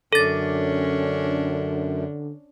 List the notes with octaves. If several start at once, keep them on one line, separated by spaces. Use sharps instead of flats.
F#2 D3 C#4 D4 A4 A6